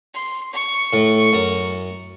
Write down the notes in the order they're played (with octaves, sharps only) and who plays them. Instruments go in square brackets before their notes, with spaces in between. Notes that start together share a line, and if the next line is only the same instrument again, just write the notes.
[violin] C6
C#6
[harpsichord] A2
F#2 A#5